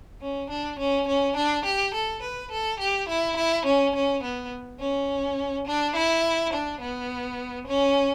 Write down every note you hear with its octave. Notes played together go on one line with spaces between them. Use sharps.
C#4
D4
C#4
C#4
D4
G4
A4
B4
A4
G4
E4
E4
C#4
C#4
B3
C#4
D4
E4
D4
B3
C#4